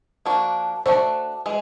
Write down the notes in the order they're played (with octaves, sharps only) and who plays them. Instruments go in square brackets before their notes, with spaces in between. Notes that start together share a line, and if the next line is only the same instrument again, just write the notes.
[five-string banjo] F3 A#3 D4 F#4
[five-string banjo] A3 D4 F#4 A4 [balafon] C5
[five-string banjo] E3 G#3